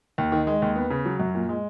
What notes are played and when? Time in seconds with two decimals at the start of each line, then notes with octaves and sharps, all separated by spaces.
0.18 D#2
0.32 D#3
0.47 G#3
0.62 D#2
0.76 B3
0.90 C#3
1.05 F#3
1.20 F#2
1.35 A#2
1.49 G#3